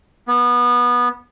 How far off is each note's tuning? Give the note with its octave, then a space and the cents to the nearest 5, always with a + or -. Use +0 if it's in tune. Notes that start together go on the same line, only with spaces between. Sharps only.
B3 -20